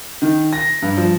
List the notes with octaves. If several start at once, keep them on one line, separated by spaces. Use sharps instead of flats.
D#3
A#6
G2
F3